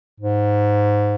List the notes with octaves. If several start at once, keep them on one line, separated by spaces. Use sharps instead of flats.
G#2